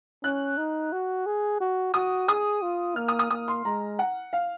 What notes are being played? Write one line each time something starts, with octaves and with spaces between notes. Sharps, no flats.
C#4 F#6
D#4
F#4
G#4
F#4
F#4 D#6
G#4 D#6
F4
A#3 F6
D#6
D#6
A#3 D#6
C6
G#3 A#5
F#5
F5